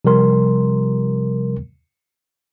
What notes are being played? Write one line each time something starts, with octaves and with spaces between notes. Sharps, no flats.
C3 F3 G3 A#4 C6